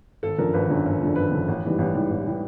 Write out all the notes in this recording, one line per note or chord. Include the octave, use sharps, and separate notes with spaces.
G#1 A4
F#2 D3 F3 A#4
G#1 B4
F#2 D3 F3
G#1
F#2 D3 F3
G#1 B4
F#2 D3 F3
A1
G#2 E3 G3
A1 B4
G#2 E3 G3
A1
E3 G3